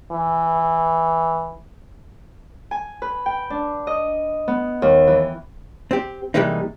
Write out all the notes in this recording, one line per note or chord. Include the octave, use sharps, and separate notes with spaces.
E3
G#5
B4
G5
D4
D#5
B3
D#2
E3
C4 G4
C3 E3 G3 G#3 A#3 D#4